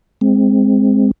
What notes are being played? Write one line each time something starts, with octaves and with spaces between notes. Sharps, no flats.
G#3 C4